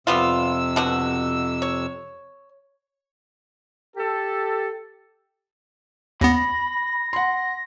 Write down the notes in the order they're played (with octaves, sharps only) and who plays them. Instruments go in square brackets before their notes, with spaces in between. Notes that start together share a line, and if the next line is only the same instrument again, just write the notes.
[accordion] F2 C3 E6 [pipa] G3 B3 F4
[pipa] B2 D3 F#4
C#5
[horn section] G4 A4
[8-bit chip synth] D#2 B3 [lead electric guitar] B5 [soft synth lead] A#6
[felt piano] F#5 C6